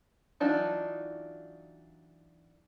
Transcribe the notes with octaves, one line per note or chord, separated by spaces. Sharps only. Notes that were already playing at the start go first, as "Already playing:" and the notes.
E3 F#3 D4 D#4 F4